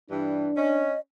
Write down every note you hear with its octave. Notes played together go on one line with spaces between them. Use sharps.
G2 E3 D4
C#4 D#5